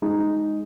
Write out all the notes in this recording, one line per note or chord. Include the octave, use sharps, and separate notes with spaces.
G#3 D#4